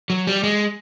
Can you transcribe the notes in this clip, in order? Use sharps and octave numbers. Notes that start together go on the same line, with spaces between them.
F#3
G3
G#3